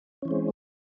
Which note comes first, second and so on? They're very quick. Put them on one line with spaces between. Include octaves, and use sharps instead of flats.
C#4 E3 C4 G#3